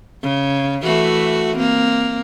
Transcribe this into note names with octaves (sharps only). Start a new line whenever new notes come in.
C#3
E3 A3 F#4
A#3 C4